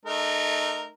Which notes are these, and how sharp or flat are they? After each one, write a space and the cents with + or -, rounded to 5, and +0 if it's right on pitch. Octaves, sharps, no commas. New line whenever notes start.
A3 -15 D#4 -30 A#4 -5